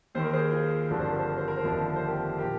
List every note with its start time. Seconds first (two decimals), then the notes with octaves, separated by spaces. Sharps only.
0.15 D#2 D#3 C5
0.24 A#4
0.33 G#4 C5
0.52 F4 G#4
0.89 G#1 G2 D3 F3 A#4
0.99 C5
1.09 A#4
1.19 C5
1.28 A#4
1.37 C5
1.48 A#4
1.57 C5
1.64 F1 D#2 D3 F3 A#4
1.77 C5
1.86 A#4
1.96 C5
2.06 G4 A#4
2.38 A#2 F3 G4 A#4